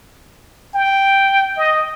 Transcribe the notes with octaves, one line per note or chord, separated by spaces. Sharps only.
G5
D#5